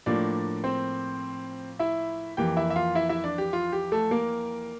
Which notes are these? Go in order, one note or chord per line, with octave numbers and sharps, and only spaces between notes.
A2 F3 A#3 D4 D5
C4 C5
E4 E5
F2 E3 A#3 G4 G5
E4 E5
E5
F4 F5
E4 E5
E4 E5
D4 D5
G4
F4
G4
A3 A4
A#3 A#4